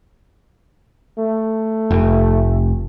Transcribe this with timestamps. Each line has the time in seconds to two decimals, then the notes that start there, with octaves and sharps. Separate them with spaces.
1.18 A3
1.91 F1